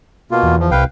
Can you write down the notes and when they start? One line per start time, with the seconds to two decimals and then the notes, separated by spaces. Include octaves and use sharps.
0.31 B2 A#3 F4
0.43 E2
0.59 F3
0.71 C2 B4 F5 G5